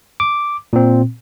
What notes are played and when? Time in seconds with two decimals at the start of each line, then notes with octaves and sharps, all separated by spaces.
0.20 D6
0.73 A#2 C4